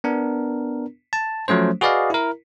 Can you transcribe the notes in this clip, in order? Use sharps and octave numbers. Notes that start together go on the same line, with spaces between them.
B3 D4 A#4
A5
F3 F#3 A3 C#4 C5
F#4 G#4 B4 D5 D#5 F5
E4 A#4